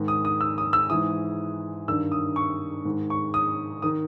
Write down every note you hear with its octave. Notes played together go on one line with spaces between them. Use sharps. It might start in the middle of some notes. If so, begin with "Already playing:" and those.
Already playing: G#2 D#3
D#6
D#6
E6
D#6
E6
G#2 E3 D#6
G2 D#3 E6
D#6
C#6
G#2 D#3
C#6
D#6
D#3 D#6